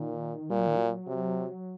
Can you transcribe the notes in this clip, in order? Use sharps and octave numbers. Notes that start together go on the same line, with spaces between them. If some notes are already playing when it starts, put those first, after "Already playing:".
Already playing: A#2 D#3
A#2 G3
F#3
D#3
F#3
C3